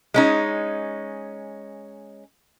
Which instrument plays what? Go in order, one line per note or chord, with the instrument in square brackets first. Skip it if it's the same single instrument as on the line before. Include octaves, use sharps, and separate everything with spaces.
[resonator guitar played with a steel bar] G#3 C#4 D#4